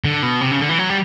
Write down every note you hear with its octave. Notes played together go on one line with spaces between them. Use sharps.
D3
B2
C3
C#3
D3
E3
F#3
G3